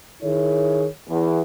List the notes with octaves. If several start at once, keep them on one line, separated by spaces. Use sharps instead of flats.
D#3 E4 G#4 C#5
E2